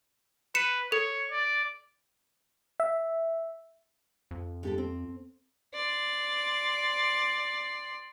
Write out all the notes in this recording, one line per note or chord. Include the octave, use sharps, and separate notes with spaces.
B4 C#7 E7
A4 C#5
D5
E5
F2
D3 G4 A4
C4
D5 C6